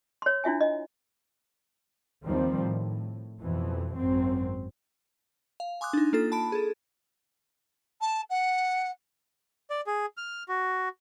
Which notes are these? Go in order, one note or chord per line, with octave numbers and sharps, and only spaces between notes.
C#5 C6
D4 E4 F4 E5 G#5
D#5
D#2 D#3 F3 G3 C4
A2
F2 B2 E3
G#1 F#2 C4
F5
G#5 C6 D6 D#6 F#6
D4 D#4
A#3 F4 A4 A6
A5 B5 D7
G#4 A4
A5
F#5
D5
G#4
F6
F#4